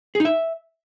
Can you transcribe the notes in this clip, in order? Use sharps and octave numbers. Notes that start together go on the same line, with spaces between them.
G#4
D#4
E5